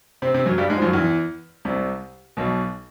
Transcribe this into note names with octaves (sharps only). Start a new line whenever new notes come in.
C3 C4
C3 C4
F#2 F#3
G2 G3
G#2 G#3
F3
F#2 F#3
E2 E3
C2 C3
B1 B2